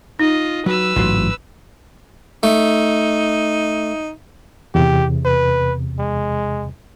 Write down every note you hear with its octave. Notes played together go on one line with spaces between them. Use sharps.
D#4 F4 D#5
F#3 B4 E6
A1 G#2 F#3 F4 F#4 C6
A3 D#4
E2 C3 G4
B4
G#3